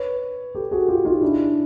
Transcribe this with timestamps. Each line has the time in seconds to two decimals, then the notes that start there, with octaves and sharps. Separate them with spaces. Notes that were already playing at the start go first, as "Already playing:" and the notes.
Already playing: B4 C#5
0.55 G4 A4
0.71 F#4 G#4
0.88 F4 G4
1.05 D#4 F4
1.22 D4 E4